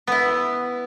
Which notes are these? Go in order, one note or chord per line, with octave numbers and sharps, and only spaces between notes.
B3 E4